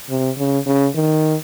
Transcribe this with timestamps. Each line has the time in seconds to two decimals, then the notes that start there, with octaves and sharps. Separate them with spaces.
0.10 C3
0.38 C#3
0.66 C#3
0.95 D#3